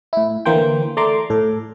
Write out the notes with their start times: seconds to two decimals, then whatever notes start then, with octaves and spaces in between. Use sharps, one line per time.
0.13 A2 E4
0.45 D3 E3 A#3 C5 G5
0.97 A3 D5 A#5 C6 D6
1.30 A2 A4